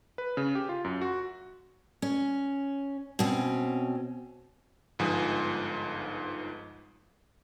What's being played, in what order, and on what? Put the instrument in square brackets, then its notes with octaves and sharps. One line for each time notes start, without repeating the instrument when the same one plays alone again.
[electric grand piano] B4
C#3
G4
F4
F#2
F#4
[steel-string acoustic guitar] C#4
B2 C4 C#4
[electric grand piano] G1 G#2 F3 B4 G#5 D#6